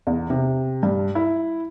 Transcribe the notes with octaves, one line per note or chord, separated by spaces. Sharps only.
E2
C3
G2
E4